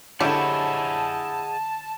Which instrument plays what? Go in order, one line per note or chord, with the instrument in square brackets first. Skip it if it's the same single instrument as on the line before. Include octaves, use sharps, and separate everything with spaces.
[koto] D3 G4 [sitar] E4 C#5 [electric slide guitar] G#4 D#5 F#5 [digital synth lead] A5